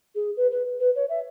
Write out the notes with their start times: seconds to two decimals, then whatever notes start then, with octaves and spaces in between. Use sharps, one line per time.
0.15 G#4
0.37 B4
0.51 B4
0.80 B4
0.96 C#5
1.09 E5